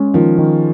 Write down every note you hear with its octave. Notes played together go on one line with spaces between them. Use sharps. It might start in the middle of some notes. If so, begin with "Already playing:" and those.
Already playing: G#3 C#4
D#3 F3
D#3